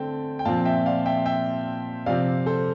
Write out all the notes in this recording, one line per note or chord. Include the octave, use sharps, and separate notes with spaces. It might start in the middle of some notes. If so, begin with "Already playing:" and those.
Already playing: D3 A3 C4 G5 A5
G5
A#2 F3 C4 F5 A5
E5 G5
D5 F5
E5 G5
E5 G5
C3 F3 C4 D5 F5
A4 C5